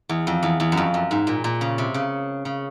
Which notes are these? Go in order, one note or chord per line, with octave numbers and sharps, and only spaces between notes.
E2
F2
E2
E2
F#2
F2
F#2
G#2
A#2
A#2
C#3
C3
C#3
C#3